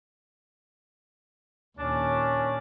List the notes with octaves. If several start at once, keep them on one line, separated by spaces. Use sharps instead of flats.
D#2 A#2 C#4 D4